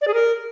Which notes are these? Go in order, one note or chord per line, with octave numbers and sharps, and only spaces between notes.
D5
G#4
A#4